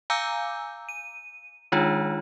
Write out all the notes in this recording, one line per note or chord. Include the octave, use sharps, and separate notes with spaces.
F5 G#5 A#5 D6 E6 G6
D#7
D#3 G#3 D4 D#4 F4